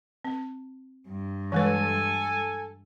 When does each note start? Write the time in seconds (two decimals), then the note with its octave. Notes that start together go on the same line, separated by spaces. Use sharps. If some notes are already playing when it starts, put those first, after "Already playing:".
0.25 C4
1.09 G2
1.52 E3 G#3 A4 B4 G#5